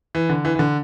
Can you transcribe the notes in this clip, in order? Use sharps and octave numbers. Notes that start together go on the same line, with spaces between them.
E3
D3
E3
E3
D3